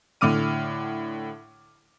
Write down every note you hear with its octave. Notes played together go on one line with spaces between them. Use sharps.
A2 D3 D6 F6 D#7